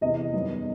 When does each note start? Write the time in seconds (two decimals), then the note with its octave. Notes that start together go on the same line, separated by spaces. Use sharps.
0.01 E2 C3 E3 D#5
0.33 F#2 D#3 G3 B3